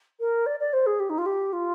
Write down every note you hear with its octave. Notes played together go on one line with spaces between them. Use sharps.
A#4
D5
D5
C5
G#4
G4
D#4
F4
G4
F4